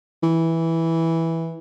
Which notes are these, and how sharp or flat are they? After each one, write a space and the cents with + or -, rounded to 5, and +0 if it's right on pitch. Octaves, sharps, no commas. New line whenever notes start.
E3 -5